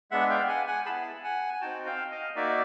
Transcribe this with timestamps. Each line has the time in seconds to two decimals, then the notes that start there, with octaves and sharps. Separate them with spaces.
0.11 G#3 B3 D4 E5 F#5
0.30 F5 G5
0.48 F#5 G#5
0.67 F#5 G#5
0.86 B3 E4 G#4 A5 B5
1.24 F#5 G#5
1.53 G#5
1.61 C4 D#4 F#4 G5 A5
1.86 F5 G5
2.11 D#5 F5
2.36 A#3 D#4 F#4 D5 E5